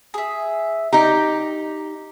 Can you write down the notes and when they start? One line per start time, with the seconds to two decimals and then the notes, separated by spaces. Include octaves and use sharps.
0.14 G#4 E5
0.93 D#4 G4 A#5 D6